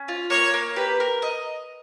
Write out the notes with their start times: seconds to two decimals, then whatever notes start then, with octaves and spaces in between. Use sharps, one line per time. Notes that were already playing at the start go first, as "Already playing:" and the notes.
Already playing: C#4
0.08 F4
0.30 A#3 C#5
0.54 A#3
0.76 G4 B4
1.00 A#4
1.22 D#5